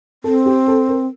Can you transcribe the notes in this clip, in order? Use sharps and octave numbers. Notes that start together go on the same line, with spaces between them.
C4 A4
G4
A4
A#4